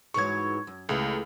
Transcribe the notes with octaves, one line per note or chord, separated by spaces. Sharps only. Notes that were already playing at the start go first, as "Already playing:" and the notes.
G#2 E3 F#3 C#6 G#6
F#2
C#2 E3 G#3 A3